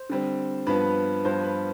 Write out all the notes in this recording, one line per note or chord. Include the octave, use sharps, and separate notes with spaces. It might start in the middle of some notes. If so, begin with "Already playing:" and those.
Already playing: C5
D3 G3 C4
G2 F3 B3 B4
G2 F3 B3 C5
B4